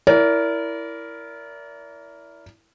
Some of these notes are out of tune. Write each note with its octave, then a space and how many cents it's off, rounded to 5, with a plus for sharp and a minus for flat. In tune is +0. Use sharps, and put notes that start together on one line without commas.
E4 +0 A#4 +0 D5 -35